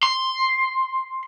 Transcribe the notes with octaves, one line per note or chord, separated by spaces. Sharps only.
C6